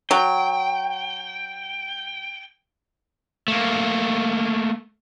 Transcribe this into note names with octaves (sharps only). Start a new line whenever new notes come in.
F#3 G5
A3 A#3